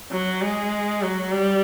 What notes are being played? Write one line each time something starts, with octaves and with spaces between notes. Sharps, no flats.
F#3
G#3
F#3
G3